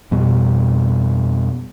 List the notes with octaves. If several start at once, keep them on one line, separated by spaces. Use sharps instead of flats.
F2 B2 G3